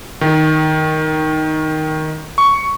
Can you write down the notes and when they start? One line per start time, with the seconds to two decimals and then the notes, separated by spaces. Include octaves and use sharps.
0.21 D#3
2.38 C#6